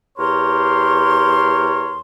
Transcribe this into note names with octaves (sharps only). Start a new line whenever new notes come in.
E2 G4 A#4 C#5 C6